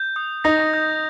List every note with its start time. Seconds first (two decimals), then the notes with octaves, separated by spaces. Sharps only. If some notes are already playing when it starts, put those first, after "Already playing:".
Already playing: G6
0.16 D#6
0.44 D#4 A#6
0.74 G6